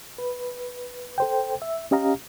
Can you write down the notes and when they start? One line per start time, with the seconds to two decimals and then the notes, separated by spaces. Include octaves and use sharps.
0.18 B4
1.18 A4 C5 G5
1.62 E5
1.91 C#4 G4 D#5 F5 A#5